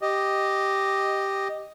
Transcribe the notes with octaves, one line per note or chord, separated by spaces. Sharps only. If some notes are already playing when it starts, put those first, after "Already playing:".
G4 D#5